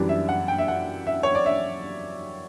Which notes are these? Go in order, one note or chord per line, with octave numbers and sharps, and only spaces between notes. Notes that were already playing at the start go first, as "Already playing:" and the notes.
Already playing: F#2 E3 G3 D4
E5
F#5
G5
E5
F#5
E5
C#5
D5
E5